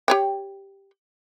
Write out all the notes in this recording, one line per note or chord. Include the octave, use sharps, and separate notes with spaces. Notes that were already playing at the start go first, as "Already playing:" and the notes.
G4 C#5 G5